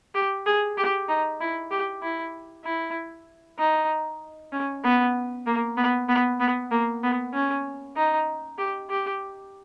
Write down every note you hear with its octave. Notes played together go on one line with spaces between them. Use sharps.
G4
G#4
G4
D#4
E4
G4
E4
E4
D#4
C#4
B3
A#3
B3
B3
B3
A#3
B3
C#4
D#4
G4
G4